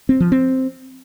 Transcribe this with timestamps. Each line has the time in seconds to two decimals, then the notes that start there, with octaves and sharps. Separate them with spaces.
0.09 C4
0.20 F3
0.32 C4